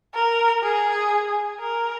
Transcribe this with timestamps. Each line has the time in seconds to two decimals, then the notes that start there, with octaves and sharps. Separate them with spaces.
0.14 A#4
0.63 G#4
1.60 A#4